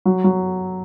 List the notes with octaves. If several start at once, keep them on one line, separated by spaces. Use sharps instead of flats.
F#3
F#3